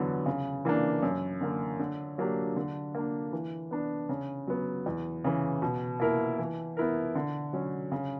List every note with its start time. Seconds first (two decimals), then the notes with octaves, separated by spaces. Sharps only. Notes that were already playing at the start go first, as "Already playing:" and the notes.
Already playing: E2 D3 F#3 B3
0.26 C#3
0.65 E3 A#3 D4
1.02 F#2
1.41 D3 A#3
1.79 D3
2.18 F#3 A#3 D4 G4
2.56 D3
2.95 A#3 D4
3.32 E3
3.71 B3 D4
4.09 C#3
4.47 F#3 B3
4.86 E2
5.24 C#3 E3
5.62 B2
6.00 A#3 E4 A#4
6.39 E3
6.77 B3 E4 A#4
7.15 D3
7.53 F#3 C#4
7.92 C#3